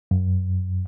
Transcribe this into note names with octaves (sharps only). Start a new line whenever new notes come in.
F#2